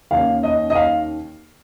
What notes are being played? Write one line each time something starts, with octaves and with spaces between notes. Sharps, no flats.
D#2 D#3 A#3 C#4 F5
D#5
D#5
F5